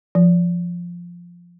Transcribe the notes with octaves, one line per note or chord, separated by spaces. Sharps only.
F3